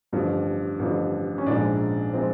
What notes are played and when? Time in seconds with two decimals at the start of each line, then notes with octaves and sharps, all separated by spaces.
0.12 A1 G2 D3 F3
0.79 A1 G2 D3 F3
1.38 C#4
1.46 A#1 G#2 F3 G#3 D4
2.14 F3 G#3 C4